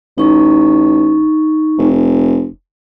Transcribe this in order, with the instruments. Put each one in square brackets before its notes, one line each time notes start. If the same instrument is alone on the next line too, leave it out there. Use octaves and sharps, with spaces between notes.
[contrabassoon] A1 [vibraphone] D#4 C#6
[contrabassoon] F1